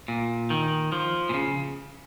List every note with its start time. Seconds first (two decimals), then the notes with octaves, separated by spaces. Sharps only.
0.08 A#2
0.50 D#3
0.92 F3
1.29 A#2
1.34 C#3